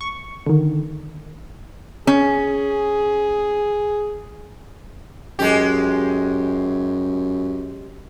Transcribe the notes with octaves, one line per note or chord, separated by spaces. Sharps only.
C#6
D3 D#3
C#4 G#4
F#2 G#3 G4